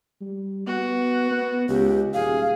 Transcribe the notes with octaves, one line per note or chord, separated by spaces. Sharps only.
G3
B3 F#4
B3
C#2 G4
D#1 G#4 F5